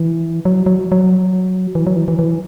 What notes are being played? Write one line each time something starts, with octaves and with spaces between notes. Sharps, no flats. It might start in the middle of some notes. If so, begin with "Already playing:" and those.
Already playing: E3
F#3
F#3
F#3
E3
F#3
E3
E3
E3